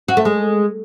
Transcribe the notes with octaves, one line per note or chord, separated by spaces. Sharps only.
F#4
A3
G#3